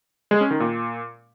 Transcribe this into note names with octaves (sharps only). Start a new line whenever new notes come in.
G#3
C#4
D#3
A#2